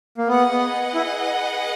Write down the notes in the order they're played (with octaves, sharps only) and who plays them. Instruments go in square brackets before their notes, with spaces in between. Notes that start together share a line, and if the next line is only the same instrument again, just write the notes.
[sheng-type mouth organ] A#3
[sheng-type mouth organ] B3 [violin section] G#4 B4 D#5 F#5
[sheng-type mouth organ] B3
E4